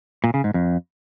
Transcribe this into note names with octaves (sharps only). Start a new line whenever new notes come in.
A#2
C#3
G#2
F2